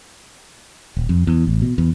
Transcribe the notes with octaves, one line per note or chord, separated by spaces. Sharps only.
D#1
F2
E2
A1
B2
E2